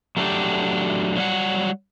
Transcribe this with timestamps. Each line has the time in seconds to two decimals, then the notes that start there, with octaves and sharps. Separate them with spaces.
0.17 F#3 A3 D4 F#4 G4
1.16 F#3 G3 F#5